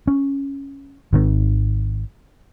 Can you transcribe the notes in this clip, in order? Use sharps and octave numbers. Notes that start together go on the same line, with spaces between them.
C#4
G#1 D#3 C4